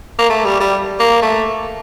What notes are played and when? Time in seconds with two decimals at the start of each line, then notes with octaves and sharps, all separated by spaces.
0.19 A#3
0.30 A3
0.45 G3
0.60 G3
1.00 A#3
1.22 A3